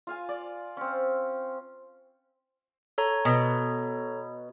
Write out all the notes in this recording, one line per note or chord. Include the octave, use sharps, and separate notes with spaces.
F4 F5 G#5
D5
C4 C#4
A4 C#5 A#5
B2